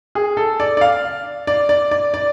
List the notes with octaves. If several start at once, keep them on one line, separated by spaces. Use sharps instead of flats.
G#4
A4
D5
D5
F5
D5
D5
D5
D5